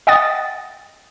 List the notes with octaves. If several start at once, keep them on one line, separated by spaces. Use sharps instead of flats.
D#5 F#5 G5 D#6 A6